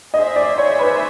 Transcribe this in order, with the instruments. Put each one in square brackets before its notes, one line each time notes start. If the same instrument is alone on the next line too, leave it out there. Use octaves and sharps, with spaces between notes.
[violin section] G#4 C5 E5 [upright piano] D#5
[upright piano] D5
C#5
B4